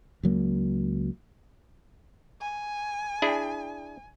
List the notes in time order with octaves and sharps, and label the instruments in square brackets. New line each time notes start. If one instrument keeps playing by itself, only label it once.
[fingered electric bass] C#2 F#3 A#3
[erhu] G#5
[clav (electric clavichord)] D4 E4 G#4